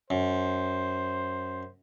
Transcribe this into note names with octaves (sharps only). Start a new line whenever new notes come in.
F#2 C5